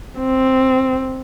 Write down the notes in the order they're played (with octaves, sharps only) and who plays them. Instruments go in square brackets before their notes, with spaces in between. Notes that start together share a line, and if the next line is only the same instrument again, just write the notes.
[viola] C4